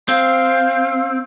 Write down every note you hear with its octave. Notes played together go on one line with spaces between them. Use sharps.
C4 F5